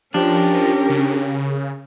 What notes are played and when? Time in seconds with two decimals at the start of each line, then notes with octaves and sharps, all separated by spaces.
0.14 F3 C#4 D4 G4 A#4
0.90 C#3